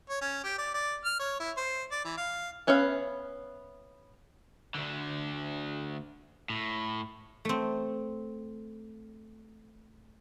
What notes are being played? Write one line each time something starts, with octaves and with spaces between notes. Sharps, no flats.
C#5
C#4
G4
D5
D5
F6
C#5
E4
C5
D5
E3
F5
B3 C#4 B4 E5 F5
D2 D3
A2
A3 C4